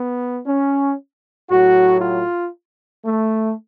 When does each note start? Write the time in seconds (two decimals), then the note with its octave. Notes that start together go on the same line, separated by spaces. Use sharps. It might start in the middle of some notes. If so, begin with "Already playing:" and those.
Already playing: B3
0.46 C#4
1.50 A2 F#3 F#4
2.01 F4
3.04 A3